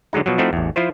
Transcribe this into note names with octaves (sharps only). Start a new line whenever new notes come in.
D3 F#3 G#3 D#4
B2 F3 F#3
F3 A3 C4 D#4 E4 F#4
A1 E2
F3 E4 F4 C5